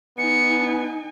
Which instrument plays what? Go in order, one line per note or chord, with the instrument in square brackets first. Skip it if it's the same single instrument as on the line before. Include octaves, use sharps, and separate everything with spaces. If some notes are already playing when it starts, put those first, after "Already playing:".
[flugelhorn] B3 [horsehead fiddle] D#4 G#5 [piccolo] C#7